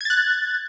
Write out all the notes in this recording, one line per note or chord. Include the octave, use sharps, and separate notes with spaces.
F#6 G#6 A6